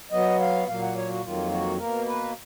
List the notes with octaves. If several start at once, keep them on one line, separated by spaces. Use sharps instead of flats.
B2 F#3 B3 D#5
F5
A#2 F#3 A#3 F5
F#5
C#5
F#4
F2 D#3 F#3 A#3 F4
F#4
B2 A#3 A#4
B4